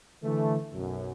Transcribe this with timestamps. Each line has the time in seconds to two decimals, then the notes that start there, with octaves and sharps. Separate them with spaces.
0.24 D3 E3 A3
0.74 B1 F#2